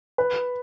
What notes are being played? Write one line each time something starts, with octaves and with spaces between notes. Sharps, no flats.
B4